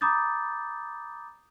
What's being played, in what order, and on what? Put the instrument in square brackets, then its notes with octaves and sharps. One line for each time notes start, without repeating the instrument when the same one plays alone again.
[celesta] A#5 B5 D6 D#6 G6 A6